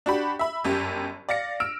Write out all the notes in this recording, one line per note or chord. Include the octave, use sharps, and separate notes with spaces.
D4 F#4 G4 B5
E5 B5
G1 F#2 G4
D5 F5 A#6 C#7
E6 F6 D7